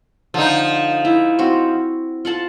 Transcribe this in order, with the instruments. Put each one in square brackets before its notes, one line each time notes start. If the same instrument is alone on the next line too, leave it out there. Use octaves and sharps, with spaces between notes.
[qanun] D3 [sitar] F3 D#4
[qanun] E4
C4 F#4
F4 F#5 A5